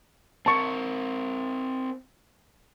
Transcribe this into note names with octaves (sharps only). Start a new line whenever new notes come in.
C4 A#4 A5 C#6